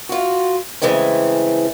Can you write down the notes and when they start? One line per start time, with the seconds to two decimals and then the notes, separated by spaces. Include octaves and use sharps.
0.09 F4 F#4
0.82 C#3 E3 G#3 A3 C4